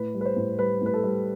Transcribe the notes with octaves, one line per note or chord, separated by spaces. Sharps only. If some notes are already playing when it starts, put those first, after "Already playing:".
Already playing: A2 B4
G3
B4
C5
A2
G3 B4
A2 B4
A4
G3